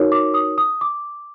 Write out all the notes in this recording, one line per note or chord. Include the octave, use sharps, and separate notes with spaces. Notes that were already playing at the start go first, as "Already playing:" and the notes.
Already playing: D#4 F#4 A#4 C#5
D6
D#6
D#6
D6